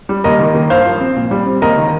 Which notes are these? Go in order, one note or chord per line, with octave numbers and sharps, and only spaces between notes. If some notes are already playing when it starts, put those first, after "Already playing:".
G3
D#2 A#4 D#5
D#3
A#3
G2 C5 F5
F3
C4
A#2
G3
C4
D#2 A#4 D#5
D#3